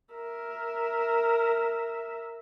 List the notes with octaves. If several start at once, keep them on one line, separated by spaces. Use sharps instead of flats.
A#4 E5